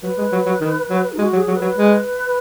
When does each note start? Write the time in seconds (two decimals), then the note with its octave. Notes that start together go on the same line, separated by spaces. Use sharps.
0.03 F#3 B4
0.18 G#3
0.32 F#3
0.46 F#3
0.61 D#3
0.90 F#3
1.13 D#4
1.19 G#3 F#4
1.33 F#3
1.37 G#4
1.48 F#3
1.56 B4
1.61 F#3
1.76 G#3